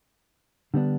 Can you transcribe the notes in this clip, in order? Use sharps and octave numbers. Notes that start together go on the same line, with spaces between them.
D3 G3 B3 D4